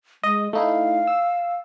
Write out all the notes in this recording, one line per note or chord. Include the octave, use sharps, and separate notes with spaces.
G#3 D#5
A3 D#4 E4 F5
E6